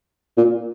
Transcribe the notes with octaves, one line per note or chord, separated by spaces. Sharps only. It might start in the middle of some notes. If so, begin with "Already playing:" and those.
A#2